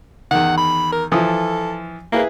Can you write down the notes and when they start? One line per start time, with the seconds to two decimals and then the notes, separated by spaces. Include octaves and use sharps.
0.31 E2 D#3 F#5
0.58 B5
0.92 A#4
1.12 E3 F3 A4 D#6
2.12 A#3 E4 G#4 B4